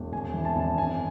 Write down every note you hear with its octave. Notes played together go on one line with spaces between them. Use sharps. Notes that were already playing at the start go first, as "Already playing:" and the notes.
Already playing: E1
G#1 G#5
E3
A5
G#1
F#2 G#5